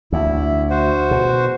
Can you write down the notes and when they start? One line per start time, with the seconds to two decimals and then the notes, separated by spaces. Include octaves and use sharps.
0.12 D2 E4
0.70 F#4 C5
1.11 B2